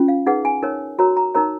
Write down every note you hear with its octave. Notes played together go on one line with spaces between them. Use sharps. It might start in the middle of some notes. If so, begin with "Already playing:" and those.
Already playing: C#4 F4
F5
D#4 G#4 B4 F#5
G#5
D#4 A#4 C#5
F#4 A#4 C#5 A#5
A#5
D#4 A#4 C#5 A#5